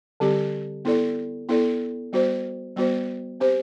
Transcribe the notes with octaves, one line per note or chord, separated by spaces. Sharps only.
D3 G3 C4 G4
B3 E4 A4 D5
B3 E4 A4 D5
G3 B3 F#4 C5
G3 B3 F#4 C5
C4 G4 C5